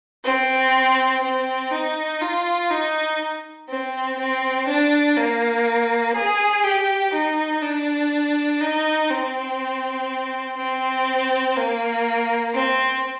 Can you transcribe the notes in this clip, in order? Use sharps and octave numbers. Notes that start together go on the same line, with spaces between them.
C4
C4
D#4
F4
D#4
C4
C4
D4
A#3
G#4
G4
D#4
D4
D#4
C4
C4
A#3
C4